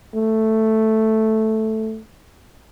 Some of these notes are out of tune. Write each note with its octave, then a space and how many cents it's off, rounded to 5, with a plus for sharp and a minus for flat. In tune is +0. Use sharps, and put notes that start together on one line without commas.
A3 +0